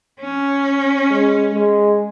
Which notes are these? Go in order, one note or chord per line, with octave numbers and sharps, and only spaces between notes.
C#4
G#3
G#3